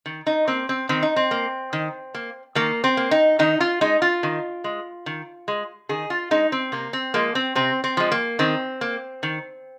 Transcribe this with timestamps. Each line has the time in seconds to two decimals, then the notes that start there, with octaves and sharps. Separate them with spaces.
0.06 D#3
0.27 D#4
0.48 A#3 C4
0.69 C4
0.89 D#3 C4
1.03 D#4
1.16 C4
1.31 A#3
1.73 D#3
2.15 A#3
2.55 D#3 A#3
2.84 C4
2.97 A#3
3.11 D#4
3.39 D#3 D#4
3.60 F4
3.81 G#3 D#4
4.02 F4
4.23 D#3
4.64 G#3
5.06 D#3
5.48 G#3
5.89 D#3 G#4
6.10 F4
6.31 G#3 D#4
6.52 C4
6.72 C3 A#3
6.93 C4
7.14 F3 G#3 A#3
7.35 C4
7.55 C3 C4
7.84 C4
7.97 F3 G#3
8.12 A#3
8.39 D#3 C4
8.81 A#3
9.23 D#3